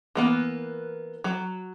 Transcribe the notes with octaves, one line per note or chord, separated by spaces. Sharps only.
E3 A#3 B3
F#3